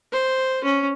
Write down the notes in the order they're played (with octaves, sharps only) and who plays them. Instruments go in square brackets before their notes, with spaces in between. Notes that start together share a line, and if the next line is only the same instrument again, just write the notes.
[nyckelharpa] C5
C#4